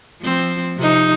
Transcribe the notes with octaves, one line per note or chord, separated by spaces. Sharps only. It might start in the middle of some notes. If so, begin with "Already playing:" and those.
F3 C4
C3 F3 D#4